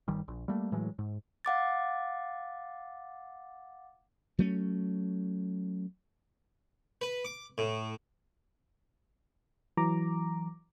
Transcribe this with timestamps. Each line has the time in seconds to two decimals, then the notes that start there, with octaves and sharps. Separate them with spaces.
0.08 G1 D#3 G3
0.28 A#1
0.48 G3 A3 A#3
0.72 A2 E3 F#3 G#3
0.99 G#2
1.45 F5 F#5 D6 A6
4.39 F#3 A3 C#4
7.01 B4
7.25 D6
7.58 A2
9.77 E3 F#3 A#5 D6